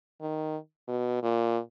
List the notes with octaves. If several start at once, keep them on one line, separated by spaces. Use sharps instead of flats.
D#3
B2
A#2